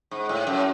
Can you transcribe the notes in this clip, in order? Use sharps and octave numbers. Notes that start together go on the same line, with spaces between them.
G#2
A2
F#2